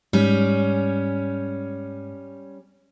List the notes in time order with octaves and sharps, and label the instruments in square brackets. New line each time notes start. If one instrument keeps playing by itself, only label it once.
[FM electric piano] G#2 [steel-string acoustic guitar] G3 C#4